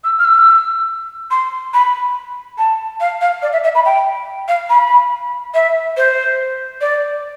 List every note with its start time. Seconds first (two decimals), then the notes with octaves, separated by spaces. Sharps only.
0.04 E6
0.18 F6
0.24 E6
1.30 C6
1.73 B5
2.57 A5
3.00 F5
3.21 F5
3.42 D5
3.52 E5
3.63 E5
3.74 B5
3.85 G5
4.48 F5
4.69 B5
5.54 E5
5.96 C5
6.80 D5